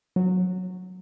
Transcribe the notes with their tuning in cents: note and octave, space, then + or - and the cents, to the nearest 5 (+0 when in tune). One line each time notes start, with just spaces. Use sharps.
F#3 -10